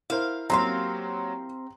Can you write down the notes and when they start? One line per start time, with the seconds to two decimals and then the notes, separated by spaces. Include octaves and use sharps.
0.10 E4 A#4 C5 F5
0.50 F#3 A#3 C4 G4 F5 A#5 C6